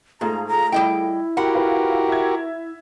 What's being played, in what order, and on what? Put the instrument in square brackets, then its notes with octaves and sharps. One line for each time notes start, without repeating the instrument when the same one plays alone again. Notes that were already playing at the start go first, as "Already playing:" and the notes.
[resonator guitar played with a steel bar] G#2 [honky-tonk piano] A3 F4 G#4 [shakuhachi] A#5
[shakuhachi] A#5
[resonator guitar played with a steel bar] G3 D#5 G5 [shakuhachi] E4
[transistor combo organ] F#4 G4 A#4 [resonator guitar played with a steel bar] F#5 [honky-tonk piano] G5 B5
[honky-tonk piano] F4 B4
E5 G#6